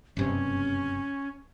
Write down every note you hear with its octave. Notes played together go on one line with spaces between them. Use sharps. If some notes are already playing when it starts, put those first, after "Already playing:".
F#1 G2 C3 C#4